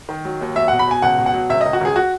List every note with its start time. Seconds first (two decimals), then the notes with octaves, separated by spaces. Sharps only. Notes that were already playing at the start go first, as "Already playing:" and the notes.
0.09 D#3
0.25 F#3
0.41 D#2
0.56 F#3 E5
0.68 B2 F#5
0.79 B5
0.87 B2 G#5
1.02 C#2 F#5
1.18 B2
1.26 F#5
1.34 F#3
1.50 C#2 E5
1.61 C#2 D#5
1.73 F#4
1.81 C#2 G#4
1.96 F#4